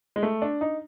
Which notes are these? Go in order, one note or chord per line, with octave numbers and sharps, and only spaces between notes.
G#3
A3
D4
D#4